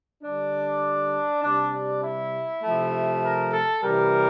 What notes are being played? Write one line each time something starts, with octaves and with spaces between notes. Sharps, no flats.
D3 G3 D4
C3 G3 D4
D4
E4
C3 F3 A3
A#4
A4
C3 E3 G3 A#4